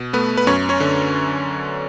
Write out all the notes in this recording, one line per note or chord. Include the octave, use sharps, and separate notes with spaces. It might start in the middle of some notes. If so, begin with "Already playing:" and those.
Already playing: B2
A3 B3 B4
B4
F#2 C#4 C#5
C#4 C#5
D3